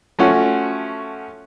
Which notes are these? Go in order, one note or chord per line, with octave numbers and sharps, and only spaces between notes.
F3 A3 C#4 F#4